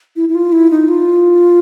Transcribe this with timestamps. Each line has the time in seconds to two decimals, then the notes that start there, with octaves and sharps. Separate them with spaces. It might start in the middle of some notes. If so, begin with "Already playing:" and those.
0.16 E4
0.29 E4
0.35 F4
0.52 E4
0.70 D#4
0.88 F4